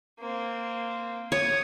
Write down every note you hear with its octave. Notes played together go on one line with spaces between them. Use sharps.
A#3 C4
C#5 D#6